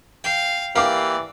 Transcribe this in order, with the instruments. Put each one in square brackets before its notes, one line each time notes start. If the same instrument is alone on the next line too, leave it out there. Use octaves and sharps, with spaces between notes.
[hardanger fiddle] F5 [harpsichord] G5
[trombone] E3 [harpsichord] A#3 G4 [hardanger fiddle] D5 [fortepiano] F5 D6